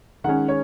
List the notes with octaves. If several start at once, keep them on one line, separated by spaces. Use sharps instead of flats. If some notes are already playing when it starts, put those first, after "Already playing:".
D#3 G#3 C#4 F#5
C#5